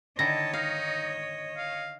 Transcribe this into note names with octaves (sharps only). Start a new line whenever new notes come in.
D3 D#3 E4 C#5 D#5 A5 A#6
D#4 F5
F5